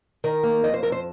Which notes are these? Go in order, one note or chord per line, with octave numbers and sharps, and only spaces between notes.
D#3 A#4
A#3
F2 D#5
C5
F2 A#4
C5